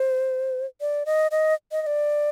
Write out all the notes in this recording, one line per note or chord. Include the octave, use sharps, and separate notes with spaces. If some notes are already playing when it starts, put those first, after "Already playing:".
Already playing: C5
D5
D#5
D#5
D#5
D#5
D5